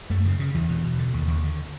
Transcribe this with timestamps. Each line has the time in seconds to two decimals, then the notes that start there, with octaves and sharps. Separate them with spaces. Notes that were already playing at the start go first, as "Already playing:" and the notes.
0.10 F#2 A3
0.25 C#3
0.40 C#3
0.54 E2 E3
0.69 B2
0.83 B2
0.99 D3
1.14 D#2
1.28 D#2
1.43 D3